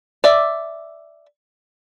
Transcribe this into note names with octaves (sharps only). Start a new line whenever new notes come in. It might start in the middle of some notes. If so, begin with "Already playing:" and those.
D5 E5